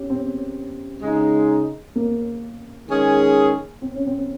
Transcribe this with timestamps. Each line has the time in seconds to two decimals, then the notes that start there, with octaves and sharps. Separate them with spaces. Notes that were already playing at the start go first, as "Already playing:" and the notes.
Already playing: C#4 G4
0.10 C4
1.02 C#3 G#3 D#4
1.96 A#3
2.88 D#3 G#3 C#4 G#4
3.81 C4
3.94 C#4
4.07 C4